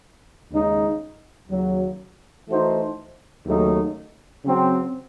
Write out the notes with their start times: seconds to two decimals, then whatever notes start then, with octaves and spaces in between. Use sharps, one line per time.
0.50 D#2 C#3 G#3 D#4
1.49 D#2 C#3 F#3
2.47 E3 A3 D#4 F#4 C5
3.45 D#2 C#3 F#3 A3 D#4
4.44 C#3 F#3 C4